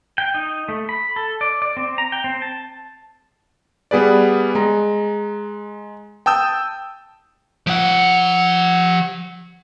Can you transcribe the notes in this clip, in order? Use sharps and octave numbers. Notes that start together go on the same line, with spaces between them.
G5
D#4
A3
B5
A4
D5
D5
C4
A#5
G5
C4
A5
G3 B3 G#4 B4 D5
G#3 A#5
G5 A5 D#6 E6 G6
F3 F#5